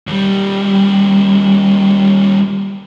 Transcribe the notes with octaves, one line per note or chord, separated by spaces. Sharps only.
D#2 G3